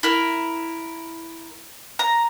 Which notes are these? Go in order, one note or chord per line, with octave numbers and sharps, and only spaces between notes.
E4 A#4
A#5